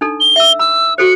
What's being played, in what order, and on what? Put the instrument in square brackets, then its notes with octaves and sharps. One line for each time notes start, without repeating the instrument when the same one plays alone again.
[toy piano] D4 D#4 A4
[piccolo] G7
[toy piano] E5 E6
[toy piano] B5 [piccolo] E6
[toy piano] F#4 A4 C5 [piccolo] C#7